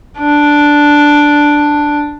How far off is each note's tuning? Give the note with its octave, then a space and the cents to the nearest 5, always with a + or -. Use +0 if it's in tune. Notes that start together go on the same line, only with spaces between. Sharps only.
D4 +0